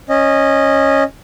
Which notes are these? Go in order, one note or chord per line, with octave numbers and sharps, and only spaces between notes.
C#4 D#5